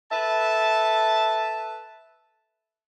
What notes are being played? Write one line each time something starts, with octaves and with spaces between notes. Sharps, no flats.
A4 B4 E5 A5